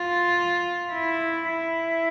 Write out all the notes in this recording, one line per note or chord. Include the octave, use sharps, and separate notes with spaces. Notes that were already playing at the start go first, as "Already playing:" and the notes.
Already playing: F4
E4
E4